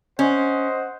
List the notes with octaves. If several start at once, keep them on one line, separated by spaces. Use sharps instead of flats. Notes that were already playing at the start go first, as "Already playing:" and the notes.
C#4 C5 D#5 F#5